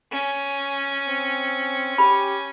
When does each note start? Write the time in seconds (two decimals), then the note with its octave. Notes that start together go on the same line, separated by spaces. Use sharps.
0.11 C#4
1.08 C4
1.98 G4 B5